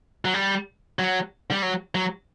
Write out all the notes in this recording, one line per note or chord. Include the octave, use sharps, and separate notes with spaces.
F#3
G3
F#3
G3
F#3
F#3